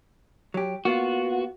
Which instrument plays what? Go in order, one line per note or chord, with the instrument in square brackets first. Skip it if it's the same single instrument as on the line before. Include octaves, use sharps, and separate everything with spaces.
[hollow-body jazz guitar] F#3 G4
[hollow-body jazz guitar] A#3 B3 F4 [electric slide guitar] F#4